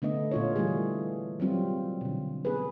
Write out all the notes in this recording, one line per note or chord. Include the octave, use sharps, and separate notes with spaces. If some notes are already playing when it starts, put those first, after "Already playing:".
D3 A3 B3 D#5
A#2 F4 C#5
D3 E3 G3 A3 G#4
F#3 G3 C4 F4
B2 D3
B3 G#4 B4